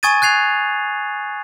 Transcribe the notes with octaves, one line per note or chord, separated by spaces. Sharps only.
G#5 C#6 D#6 G#6 A6 D#7
F#6 G#6 C7 F7